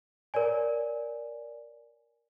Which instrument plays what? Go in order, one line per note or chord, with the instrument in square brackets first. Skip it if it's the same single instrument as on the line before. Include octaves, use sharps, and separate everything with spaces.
[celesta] A#4 C#5 D5 G#5